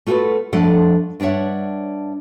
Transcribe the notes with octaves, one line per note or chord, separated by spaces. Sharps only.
A3 F4 F#4 G#4 A4 B4
F2 F3 A3 D4 A4 F#5
G2 D4 C#5 E5 F#5